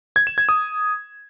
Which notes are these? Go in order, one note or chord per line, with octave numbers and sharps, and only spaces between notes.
G#6
E7
G#6
D#6